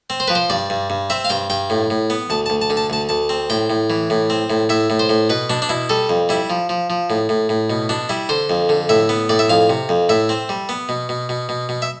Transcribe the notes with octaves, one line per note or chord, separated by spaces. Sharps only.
C4
C5
F3 B4
C5
G2 D5
G2
G2
C4 E5
F5
G2 G5
G2 G5
A2
A2
B3
D2 A5
A5
D2
A5
D3
A5
D2 A5
D2 A5
C4
A2 G5
A2
E3
A2
C4
A2
A2 E5
A2
C5
A2
B2 B4
B2 D4
D4
B2 E4
G3 A4
F2
G3 E4
F3
F3
F3
A2
A2
A2
B2
B2 D4
G3 E4
D3 C5
F2
D3
A2 E5
B3
A2 D5
E5
F2 F5
C3
F2
A2 E5
C4
G3
B3
B2
B2
B2
B2
B2
E5